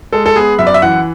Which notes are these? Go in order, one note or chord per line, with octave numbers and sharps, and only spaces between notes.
G#3 A4
A4
B3 G#4
F#2 E5
D5
E5
E3 F#5